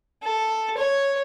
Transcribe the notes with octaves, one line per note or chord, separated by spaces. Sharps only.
A4
C#5